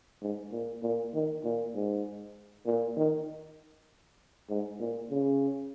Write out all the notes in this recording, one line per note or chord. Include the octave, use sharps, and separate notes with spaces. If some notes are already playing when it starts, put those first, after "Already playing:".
G#2
A#2
A#2
D#3
A#2
G#2
A#2
D#3
G#2
A#2
C#3